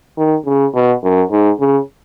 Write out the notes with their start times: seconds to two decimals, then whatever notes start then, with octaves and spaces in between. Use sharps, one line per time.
0.18 D#3
0.46 C#3
0.74 B2
1.03 F#2
1.31 G#2
1.59 C#3